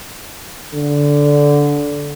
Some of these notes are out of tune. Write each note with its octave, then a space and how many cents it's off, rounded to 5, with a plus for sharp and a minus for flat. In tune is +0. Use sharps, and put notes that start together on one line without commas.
D3 -15